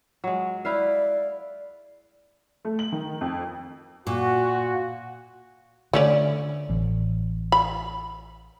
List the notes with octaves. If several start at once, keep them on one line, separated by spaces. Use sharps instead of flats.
F#3 G#3
E4 B4 D5 F5
A3
F#7
D#3
F2
A#2 F#4
D3 A3 C#4 D5
A1
B5